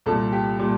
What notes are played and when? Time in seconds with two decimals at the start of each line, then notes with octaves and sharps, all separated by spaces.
0.06 C2 A#2 G3 A4
0.32 G4
0.59 A#2 G3